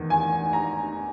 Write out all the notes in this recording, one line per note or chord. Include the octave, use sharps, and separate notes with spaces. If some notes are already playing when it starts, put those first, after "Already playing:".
Already playing: E2 D#3
G#5
A#5